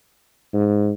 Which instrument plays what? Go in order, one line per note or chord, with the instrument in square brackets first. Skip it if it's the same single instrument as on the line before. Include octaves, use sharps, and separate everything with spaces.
[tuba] G#2